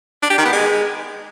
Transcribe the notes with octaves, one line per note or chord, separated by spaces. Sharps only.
D4
G4
D#3
B3
G#3